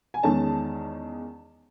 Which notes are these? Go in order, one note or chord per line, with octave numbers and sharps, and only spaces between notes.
G#5
E2 D#3 G#3 C#4 A5